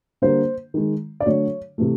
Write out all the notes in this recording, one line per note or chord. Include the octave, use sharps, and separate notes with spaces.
D3 G3 A#3 C5
D#3 G#3
D5
D3 F#3 A3 C#5
C3 E3 A3